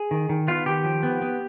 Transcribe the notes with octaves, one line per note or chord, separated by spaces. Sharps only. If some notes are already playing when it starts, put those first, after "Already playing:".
Already playing: G#4
D#3
D#3
B3 F4
D#3 G4
F3
B3
B3